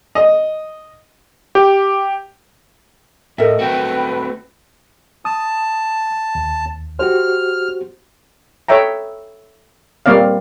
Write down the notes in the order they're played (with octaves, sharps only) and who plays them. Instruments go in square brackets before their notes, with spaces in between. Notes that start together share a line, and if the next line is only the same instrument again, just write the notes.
[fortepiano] D#5
[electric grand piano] G4
[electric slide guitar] A2 [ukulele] A4 A#4 E5 [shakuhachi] D#5
[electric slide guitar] A3 C4 F#4 [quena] B4 [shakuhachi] G5
[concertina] A5 [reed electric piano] D#6
[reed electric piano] D#2
[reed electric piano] F#4 G4 C5 [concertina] F6
[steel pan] A4 C#5 E5 G5 A#5
G3 A#3 C4 D5 F5